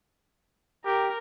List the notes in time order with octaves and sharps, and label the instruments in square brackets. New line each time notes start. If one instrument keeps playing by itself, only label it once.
[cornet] G4 [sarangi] A#4